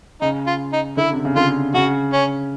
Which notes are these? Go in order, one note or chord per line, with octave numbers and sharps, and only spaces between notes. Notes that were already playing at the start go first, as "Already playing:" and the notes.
C#3 D#4
F4
D#4
D3 E4
C3
C#3
D3 F4
C#3 F#4
C#4